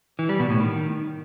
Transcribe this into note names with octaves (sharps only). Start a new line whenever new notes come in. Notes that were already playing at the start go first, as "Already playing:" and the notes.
E3
G3
B2
A2
D#3